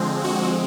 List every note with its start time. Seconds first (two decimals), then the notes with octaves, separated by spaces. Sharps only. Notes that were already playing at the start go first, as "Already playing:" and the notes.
Already playing: D3 F3 G#3 C4
0.24 F#4